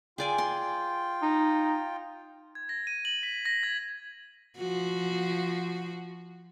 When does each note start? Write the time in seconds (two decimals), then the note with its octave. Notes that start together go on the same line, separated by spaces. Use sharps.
0.18 F4 G#4 D5 G5 G#5
0.38 C6
1.22 D#4
2.55 G#6
2.69 A#6
2.87 D#7
3.05 F#7
3.23 B6
3.45 A#6
3.63 G#6
4.58 F3 F#4